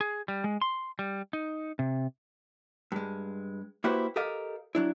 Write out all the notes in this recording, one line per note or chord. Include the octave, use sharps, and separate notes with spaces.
G#4
G3
G#3
C6
G3
D#4
C3
G2 G#3
A#3 E4 F#4 G4 B4 C5
G4 A4 A#4 D#5 F5
F#3 D4 E4